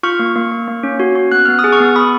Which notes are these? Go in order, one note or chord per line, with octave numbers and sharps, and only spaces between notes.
F4 C#6 F6
A#3
A#3
A#3
A#3
C#4
F#4
F#4
B3 F#6
B3 F6
D#6
G#4
C#6 F6
B3
B3 B5 D#6